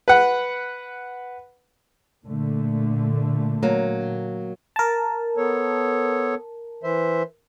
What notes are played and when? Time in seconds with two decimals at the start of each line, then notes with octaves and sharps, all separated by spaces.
0.08 B4 F#5
2.26 A#2 D3 A3
3.63 F#3 A#3
4.76 A#4 A5
5.37 B3 A4 C#5
6.83 E3 C5 E5